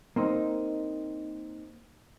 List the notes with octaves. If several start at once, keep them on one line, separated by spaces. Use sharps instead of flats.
A#3 C4 D#4